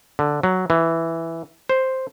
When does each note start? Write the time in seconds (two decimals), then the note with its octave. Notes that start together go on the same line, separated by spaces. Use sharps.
0.19 D3
0.43 F#3
0.70 E3
1.69 C5